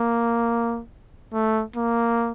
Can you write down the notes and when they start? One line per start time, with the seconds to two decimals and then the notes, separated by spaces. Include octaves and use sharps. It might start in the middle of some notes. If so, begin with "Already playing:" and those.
Already playing: A#3
1.33 A3
1.76 A#3